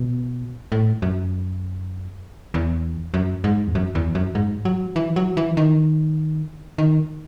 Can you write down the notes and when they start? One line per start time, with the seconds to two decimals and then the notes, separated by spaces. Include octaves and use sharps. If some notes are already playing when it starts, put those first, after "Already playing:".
Already playing: B2
0.72 A2
1.02 F#2
2.54 E2
3.14 F#2
3.44 G#2
3.68 E2
3.75 F#2
3.95 E2
4.15 F#2
4.35 G#2
4.65 F#3
4.96 E3
5.16 F#3
5.37 E3
5.57 D#3
6.78 D#3